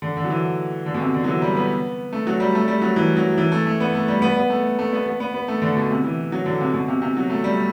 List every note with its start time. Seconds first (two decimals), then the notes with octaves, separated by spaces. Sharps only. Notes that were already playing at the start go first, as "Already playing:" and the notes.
0.02 D3
0.17 D3
0.25 F#3
0.30 E3
0.86 D3
0.94 B2
1.01 C3
1.14 D3
1.24 F#3
1.28 E3
1.42 G3
1.57 B3
2.13 A3
2.27 F#3
2.40 G3
2.55 A3
2.68 G3
2.82 F#3
2.96 E3
3.17 F#3
3.38 E3
3.52 A3
3.66 A3
3.80 B3
3.95 A3
4.08 G3
4.22 B3
4.37 B3
4.50 A3
4.79 A3
4.93 B3
5.06 B3
5.20 B3
5.34 B3
5.48 A3
5.62 D3
5.76 B2
5.91 C3
6.04 E3
6.32 F#3
6.46 D3
6.60 C3
6.74 B2
6.88 C3
7.02 C3
7.17 F#3
7.30 A3
7.44 G3